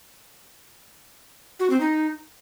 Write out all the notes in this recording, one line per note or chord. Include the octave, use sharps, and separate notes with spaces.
F#4
C4
D#4